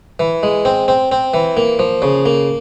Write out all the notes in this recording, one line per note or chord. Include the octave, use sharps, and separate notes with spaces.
E3
G#3
C4
C4
C4
E3
A#3
F3
C#3
A#3